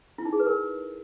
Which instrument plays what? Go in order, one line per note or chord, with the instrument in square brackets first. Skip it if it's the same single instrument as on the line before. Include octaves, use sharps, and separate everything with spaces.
[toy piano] E4
D#4
G#4
B4
A#4